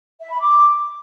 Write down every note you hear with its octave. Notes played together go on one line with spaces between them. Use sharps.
E5
B5
D6